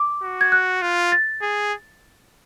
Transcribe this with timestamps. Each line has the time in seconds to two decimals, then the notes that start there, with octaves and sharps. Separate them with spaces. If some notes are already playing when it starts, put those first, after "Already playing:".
Already playing: D6
0.23 F#4
0.41 G#6
0.52 F#6
0.82 F4
1.12 A6
1.42 G#4